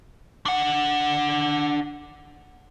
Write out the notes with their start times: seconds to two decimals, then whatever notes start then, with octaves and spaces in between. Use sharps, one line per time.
0.46 D4 F#5